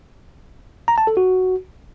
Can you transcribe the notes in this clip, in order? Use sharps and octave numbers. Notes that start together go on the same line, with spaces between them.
A#5
A5
A4
F#4